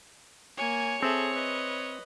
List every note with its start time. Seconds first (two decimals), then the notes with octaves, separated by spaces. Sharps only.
0.58 A#3 C#5 G#5
1.03 C4 G#4 A4 E5
1.33 B4 D#5